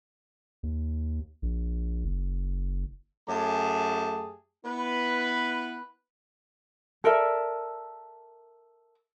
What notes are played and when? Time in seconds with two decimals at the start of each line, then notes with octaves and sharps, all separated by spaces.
0.63 D#2
1.42 A#1
2.05 F#1
3.29 F#2 A3 G4 G#4 A5
4.65 B3 E4 B4
7.04 A4 A#4 D5 E5